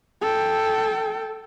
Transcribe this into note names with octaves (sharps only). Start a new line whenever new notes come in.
A4 G5